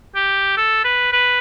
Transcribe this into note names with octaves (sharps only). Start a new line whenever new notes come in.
G4
A4
B4
B4